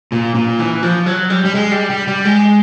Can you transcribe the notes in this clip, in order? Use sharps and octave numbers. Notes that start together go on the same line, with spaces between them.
A#2
A#2
E3
F3
F#3
G3
G3
G#3
G3
G3
G3
G#3